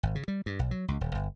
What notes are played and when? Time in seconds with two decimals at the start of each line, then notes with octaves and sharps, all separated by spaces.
0.03 G#1
0.15 C#3
0.28 G3
0.46 G2
0.59 B1
0.71 F#3
0.88 C#2
1.01 D#1
1.15 G1